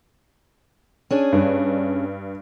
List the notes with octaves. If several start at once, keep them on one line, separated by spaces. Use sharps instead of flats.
C#4 D4 G#4
G2